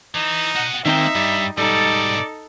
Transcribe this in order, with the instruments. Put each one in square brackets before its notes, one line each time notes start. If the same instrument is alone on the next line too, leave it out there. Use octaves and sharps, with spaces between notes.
[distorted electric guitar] E3 [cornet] D#4
[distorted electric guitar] F#4 D#5 [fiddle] F#5
[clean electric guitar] D#3 C4 G5 [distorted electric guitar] A#3 [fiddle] D#4 [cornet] E5
[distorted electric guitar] G2 [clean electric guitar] G3
[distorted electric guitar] G#2 B2 [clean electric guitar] G3 [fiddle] D#4 A4 [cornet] D5